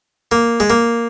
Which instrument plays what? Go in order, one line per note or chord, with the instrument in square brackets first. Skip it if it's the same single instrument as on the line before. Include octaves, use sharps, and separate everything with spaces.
[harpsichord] A#3
G#3
A#3